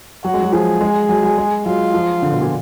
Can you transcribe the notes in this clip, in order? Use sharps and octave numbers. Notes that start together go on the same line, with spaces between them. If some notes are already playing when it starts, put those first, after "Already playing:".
F#3 F#4
G#3
F#3
F3 G#4
G#3
F#3
F#3
G#3
F#3 F4
F3
D3
B2
A#2